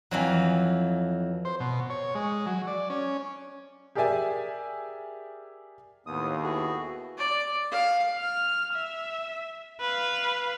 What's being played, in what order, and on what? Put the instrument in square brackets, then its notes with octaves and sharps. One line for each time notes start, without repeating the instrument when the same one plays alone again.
[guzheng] F2 E3 F#3
[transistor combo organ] C5
B2
C#5
G#3
F#3
D5
C#4
[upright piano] G4 G#4 A#4 D5 E5 G#5
[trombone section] D#2 [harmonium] A2 B3 [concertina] D#6
[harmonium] B3 E4 A4 [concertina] F#4 G#4
[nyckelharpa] D5
F5
[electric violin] F6
E5
B4 F5